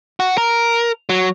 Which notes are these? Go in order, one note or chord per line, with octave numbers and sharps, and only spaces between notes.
F#4
A#4
F#3